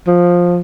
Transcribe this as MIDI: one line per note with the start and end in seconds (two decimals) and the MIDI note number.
0.07 0.61 53